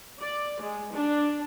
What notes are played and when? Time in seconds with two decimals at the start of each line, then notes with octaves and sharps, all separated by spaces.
0.19 D5
0.62 G#3
0.94 D4